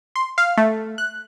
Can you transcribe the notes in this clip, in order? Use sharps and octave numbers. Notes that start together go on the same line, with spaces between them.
C6
F5
A3
F#6